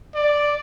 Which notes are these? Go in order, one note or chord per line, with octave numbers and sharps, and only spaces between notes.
D5